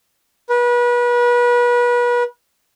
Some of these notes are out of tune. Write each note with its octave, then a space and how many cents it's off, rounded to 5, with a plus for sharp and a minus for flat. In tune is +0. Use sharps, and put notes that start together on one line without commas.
B4 -30